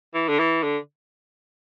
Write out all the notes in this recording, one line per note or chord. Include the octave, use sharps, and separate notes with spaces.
E3
D3
E3
D3